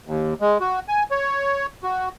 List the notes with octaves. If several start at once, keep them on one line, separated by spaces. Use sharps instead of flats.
D#2
G#3
F#4
G#5
C#5
F#4